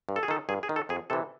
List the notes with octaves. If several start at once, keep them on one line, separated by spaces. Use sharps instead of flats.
G2
A4
G#4
D#3 A4
G2 G#4
G#4
D#3
A4
F2 G#4
C3 E3 A4